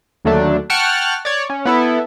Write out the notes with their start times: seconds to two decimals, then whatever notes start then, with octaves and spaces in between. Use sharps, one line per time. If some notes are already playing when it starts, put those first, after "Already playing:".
0.25 D#2 D3 F#3 A3 D4
0.70 F#5 G5 A5 C#6 F6 F#6
1.25 C#5 D5
1.49 C#4
1.65 B3 E4 A4